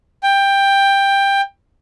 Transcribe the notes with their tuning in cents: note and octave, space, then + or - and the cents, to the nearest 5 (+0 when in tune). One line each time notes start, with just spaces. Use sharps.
G5 +15